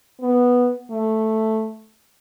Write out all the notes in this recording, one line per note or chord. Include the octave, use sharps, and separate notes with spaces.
B3
A3